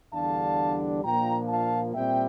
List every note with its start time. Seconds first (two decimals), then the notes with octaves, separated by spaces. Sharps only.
0.13 E2 D3 G3 D4 F5 A5
1.04 A#2 F3 A#3 D4 G5 A#5
1.49 F5 A5
1.95 A#2 G3 C4 E5 G5